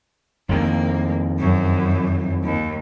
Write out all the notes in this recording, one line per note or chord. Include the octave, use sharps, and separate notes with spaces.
F2 D#3 A#3
F#2
D#2